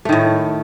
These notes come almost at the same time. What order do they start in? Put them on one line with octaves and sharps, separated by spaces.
A3 D#3 A2